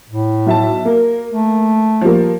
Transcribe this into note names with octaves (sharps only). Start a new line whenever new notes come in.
A2
B1 E5 A5
A#3 A#4
A3
F3 G3 A#3